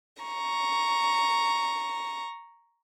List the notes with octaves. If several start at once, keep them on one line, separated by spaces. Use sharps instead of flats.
A#5 C#6